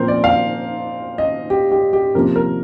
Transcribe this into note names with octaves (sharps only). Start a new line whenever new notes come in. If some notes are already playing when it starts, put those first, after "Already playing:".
Already playing: A#2 F3 C4 A#4 C5
D5
F5
D#5
G4
G4
G4
C3 F3 A#3 A#4
A#4